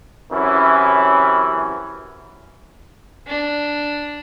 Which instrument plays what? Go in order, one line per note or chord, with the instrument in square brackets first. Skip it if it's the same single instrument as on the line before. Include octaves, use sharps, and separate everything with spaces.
[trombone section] F#2 C3 E3 C#4 E4
[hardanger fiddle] D4